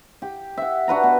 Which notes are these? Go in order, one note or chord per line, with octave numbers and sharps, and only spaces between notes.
G4
E5 F#5
D4 F#4 B4 A#5
B2